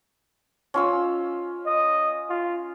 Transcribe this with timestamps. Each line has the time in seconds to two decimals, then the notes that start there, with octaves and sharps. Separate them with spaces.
0.74 C#4 F4 E6
1.66 D#5
2.30 F4